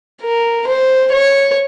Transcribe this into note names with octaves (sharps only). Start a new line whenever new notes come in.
A#4
C5
C#5